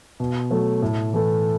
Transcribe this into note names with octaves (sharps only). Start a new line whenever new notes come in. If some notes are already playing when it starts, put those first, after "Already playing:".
B2
F#3 A3
A2
E3 A3